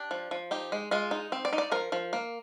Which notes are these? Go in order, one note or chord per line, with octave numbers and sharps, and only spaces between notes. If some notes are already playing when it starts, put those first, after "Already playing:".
Already playing: D4 G4
F3
F3
D#4 G4
G#3
G#3 F4
D#4
C4
D5
D#4
D5
F3 A#4
F3
A#3